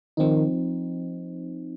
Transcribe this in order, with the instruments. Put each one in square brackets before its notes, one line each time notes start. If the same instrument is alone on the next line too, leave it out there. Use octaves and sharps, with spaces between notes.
[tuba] D#3 [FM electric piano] F3 C4 D#4